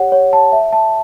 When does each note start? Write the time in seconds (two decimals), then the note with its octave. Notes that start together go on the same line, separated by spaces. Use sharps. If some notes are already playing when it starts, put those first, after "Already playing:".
Already playing: G4 C#5 F#5
0.12 C#5
0.33 A5
0.52 E5
0.72 A5